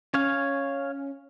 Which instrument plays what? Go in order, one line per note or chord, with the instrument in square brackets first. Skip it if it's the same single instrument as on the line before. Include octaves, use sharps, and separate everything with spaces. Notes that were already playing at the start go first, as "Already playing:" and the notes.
[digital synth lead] C#4 [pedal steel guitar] C#5 F5